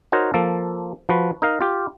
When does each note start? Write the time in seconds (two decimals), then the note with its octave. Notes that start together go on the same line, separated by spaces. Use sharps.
0.12 D#4 F#4 A#4 C5 C#5
0.34 F3 A#3 A4
1.09 F3 F#4 B4
1.42 D#4 A#4 F5
1.61 F4 G4